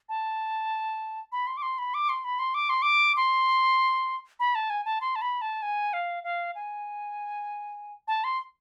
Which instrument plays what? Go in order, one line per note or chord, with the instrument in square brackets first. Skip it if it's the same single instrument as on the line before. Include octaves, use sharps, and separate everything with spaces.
[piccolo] A5
B5
C6
D6
C6
B5
D6
C6
B5
C6
D6
C6
D6
C6
B5
A5
G#5
A5
C6
A5
B5
A5
G#5
F5
F5
G#5
A5
C6